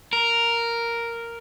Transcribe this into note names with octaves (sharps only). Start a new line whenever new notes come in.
A#4